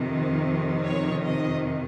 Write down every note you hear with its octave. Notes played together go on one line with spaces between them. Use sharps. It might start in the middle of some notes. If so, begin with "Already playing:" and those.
Already playing: F2 C3 D#3
C#5
D#5